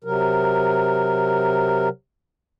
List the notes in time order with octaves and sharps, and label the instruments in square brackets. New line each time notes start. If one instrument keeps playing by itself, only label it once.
[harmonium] C3 F#3 A#4